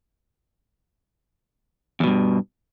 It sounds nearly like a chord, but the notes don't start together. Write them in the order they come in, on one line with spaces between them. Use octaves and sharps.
E2 B2 G2